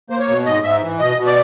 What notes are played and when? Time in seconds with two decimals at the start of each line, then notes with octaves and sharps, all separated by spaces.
0.10 A#3 C5
0.19 C#5
0.28 B2
0.46 G#2 D#5
0.63 G#2 E5
0.82 E3
0.99 B2 D#5
1.17 B2
1.26 D5